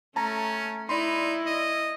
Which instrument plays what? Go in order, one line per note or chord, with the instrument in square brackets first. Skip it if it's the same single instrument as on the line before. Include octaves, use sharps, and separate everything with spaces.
[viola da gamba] A3 [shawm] C#4 [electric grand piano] A5 A#5
[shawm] D#4 [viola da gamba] E4 [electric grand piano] D5 B5 C6
[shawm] D#5